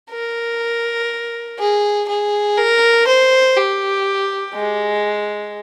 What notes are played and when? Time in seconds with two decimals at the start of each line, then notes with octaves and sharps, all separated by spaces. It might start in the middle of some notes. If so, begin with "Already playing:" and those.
0.10 A#4
1.59 G#4
2.08 G#4
2.57 A#4
3.07 C5
3.56 G4
4.55 G#3